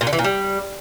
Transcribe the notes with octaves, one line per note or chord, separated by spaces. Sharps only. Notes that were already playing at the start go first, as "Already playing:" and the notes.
A#2
D3
E3
A#2
G3